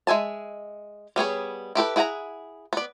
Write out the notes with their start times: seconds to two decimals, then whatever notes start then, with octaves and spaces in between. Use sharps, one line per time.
0.07 G#3 E5 G#5 A5
1.16 G3 B3 G#4 C#5
1.75 E4 G4 A4 B4
1.96 E4 G#4 F#5 G5 A#5
2.73 B3 D5